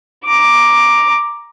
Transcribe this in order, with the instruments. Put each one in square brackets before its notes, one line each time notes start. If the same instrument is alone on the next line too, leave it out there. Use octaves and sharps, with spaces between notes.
[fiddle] A#5 D6